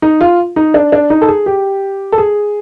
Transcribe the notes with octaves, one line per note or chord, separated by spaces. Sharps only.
D#4
F4
D#4
D4
D4
D#4
A4
G#4
G4
A4
G#4